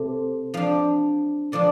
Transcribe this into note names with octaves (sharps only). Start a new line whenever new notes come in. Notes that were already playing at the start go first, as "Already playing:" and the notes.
Already playing: C3 A3 C4
F3 D4 F5
D3 F3 D4 D5